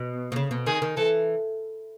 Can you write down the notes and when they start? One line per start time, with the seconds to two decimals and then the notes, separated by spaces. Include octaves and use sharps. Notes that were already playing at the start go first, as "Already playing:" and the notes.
Already playing: B2
0.32 B2
0.36 C#3
0.51 B2
0.67 D#3 G#4
0.82 D#3
0.97 E3 A4